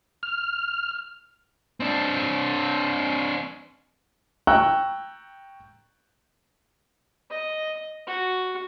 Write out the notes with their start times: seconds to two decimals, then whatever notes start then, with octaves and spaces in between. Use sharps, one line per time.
0.23 F6
1.80 C4 D4
4.47 G5 A#5 C#6 E6 F#6
7.30 D#5
8.07 F#4